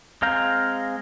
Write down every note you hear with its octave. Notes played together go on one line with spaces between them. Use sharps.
G#3 C4 F5 A#5 G6